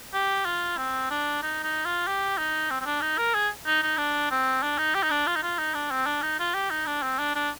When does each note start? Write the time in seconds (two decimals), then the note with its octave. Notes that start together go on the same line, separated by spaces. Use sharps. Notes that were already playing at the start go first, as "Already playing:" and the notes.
0.13 G4
0.45 F4
0.77 C4
1.11 D4
1.43 D#4
1.63 D#4
1.85 F4
2.07 G4
2.38 D#4
2.71 C4
2.81 C4
2.86 D4
3.02 D#4
3.18 A#4
3.34 G#4
3.66 D#4
3.83 D#4
3.98 D4
4.31 C4
4.63 D4
4.78 D#4
4.95 G4
5.03 D#4
5.11 D4
5.27 F4
5.36 D#4
5.43 F4
5.58 D#4
5.75 D4
5.91 C4
6.06 D4
6.22 D#4
6.40 F4
6.54 G4
6.71 D#4
6.86 D4
7.02 C4
7.19 D4
7.36 D4